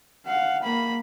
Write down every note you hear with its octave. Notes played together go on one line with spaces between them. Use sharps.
F5 F#5
A#3 B5